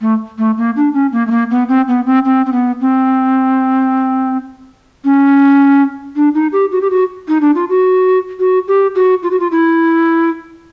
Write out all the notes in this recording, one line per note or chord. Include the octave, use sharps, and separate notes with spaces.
A3
A3
A#3
D4
C#4
A#3
A3
A#3
B3
C4
B3
C4
C4
C4
B3
C4
C#4
D4
D#4
G4
F#4
G4
F#4
D#4
D4
F4
F#4
F#4
G4
F#4
F4
F#4
F4
E4